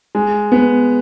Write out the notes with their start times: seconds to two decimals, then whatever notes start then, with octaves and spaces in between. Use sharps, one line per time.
0.15 G#3
0.52 B3